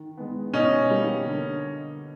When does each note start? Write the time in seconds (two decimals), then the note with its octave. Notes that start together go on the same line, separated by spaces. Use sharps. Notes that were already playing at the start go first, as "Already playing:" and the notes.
Already playing: D#3
0.17 G#3 B3
0.54 B2 C#4 D#4
0.90 G3 A#3
1.26 D3